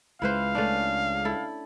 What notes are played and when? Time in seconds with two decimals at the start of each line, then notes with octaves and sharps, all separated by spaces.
0.22 C#2 G#3 E4 B4 C5 F5
0.55 A3 C#4 D4
1.25 E4 A4